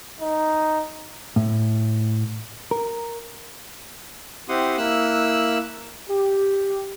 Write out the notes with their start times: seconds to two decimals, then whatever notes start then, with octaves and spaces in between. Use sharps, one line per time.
0.21 D#4
1.36 A2
2.71 A#4
4.49 C4 E4 G4 F#5 C6 D#6
4.78 A#3 E4 E6 F#6
6.09 G4